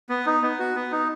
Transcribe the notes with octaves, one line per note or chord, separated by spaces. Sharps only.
B3
D#4
B3
F#4
B3
D#4